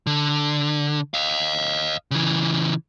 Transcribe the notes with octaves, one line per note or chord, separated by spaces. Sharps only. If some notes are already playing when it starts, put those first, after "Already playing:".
D3
D#5 F5
C#3 E3